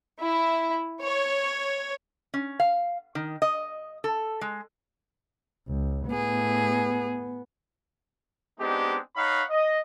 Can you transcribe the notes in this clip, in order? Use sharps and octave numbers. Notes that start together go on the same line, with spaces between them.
E4
C#5
C#4
F5
D#3
D#5
A4
G#3
C#2
A2 B3 G#4
G#3 B3 C4 D4 D#4 G4
D#4 C#5 F5 F#5 B5
D#5